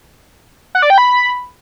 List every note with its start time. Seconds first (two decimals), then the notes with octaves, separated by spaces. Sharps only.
0.75 F#5
0.82 D5
0.90 G5
0.98 B5